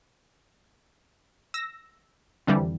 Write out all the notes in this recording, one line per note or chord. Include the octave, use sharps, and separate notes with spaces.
E6 A#6
F2 D3 E3 G3